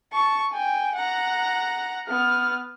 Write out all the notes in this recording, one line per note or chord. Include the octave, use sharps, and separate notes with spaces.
A5 C#6
G5 G#5
F#5 A#5
B3 F6